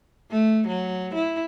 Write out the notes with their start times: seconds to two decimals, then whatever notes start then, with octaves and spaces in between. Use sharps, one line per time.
0.31 A3
0.67 F#3
1.14 E4